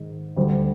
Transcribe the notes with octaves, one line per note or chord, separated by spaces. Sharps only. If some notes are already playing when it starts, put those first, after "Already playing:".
Already playing: G#2 D#3 G#3
D2 D3 G3 C4